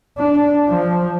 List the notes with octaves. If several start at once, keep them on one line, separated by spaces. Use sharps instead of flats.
D4
F3